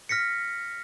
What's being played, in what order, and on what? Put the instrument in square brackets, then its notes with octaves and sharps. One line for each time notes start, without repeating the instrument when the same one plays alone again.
[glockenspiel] F6 A#6 B6 C#7